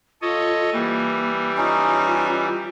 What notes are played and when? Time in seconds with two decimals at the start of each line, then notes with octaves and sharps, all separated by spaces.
0.22 F4 A4 C#5 D#5
0.73 E3 G3 A#3
1.57 C#4 D#4 F4